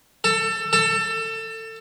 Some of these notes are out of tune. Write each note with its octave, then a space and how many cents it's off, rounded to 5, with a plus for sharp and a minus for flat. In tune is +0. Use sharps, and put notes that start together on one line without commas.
A4 +25
A4 +25